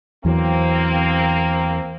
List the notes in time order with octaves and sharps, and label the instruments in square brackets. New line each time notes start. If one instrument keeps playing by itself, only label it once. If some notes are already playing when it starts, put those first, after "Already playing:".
[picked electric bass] E2 E3 F#3 [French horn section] A#3 C4